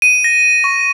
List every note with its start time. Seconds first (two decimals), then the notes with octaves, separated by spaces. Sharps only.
0.02 D#7
0.24 A#6
0.64 C#6